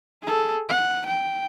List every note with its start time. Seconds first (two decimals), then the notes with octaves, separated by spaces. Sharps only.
0.22 G#4 A4
0.69 F#5
1.06 G5